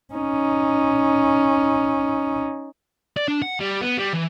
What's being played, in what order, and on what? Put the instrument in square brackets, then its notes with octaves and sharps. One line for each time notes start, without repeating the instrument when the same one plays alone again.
[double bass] C#4 D#4
[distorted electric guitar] D5
D4
F#5
G3
B3
G3
E3